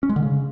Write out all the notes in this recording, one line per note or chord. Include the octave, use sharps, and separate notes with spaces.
C#4
G#3
D3
C#3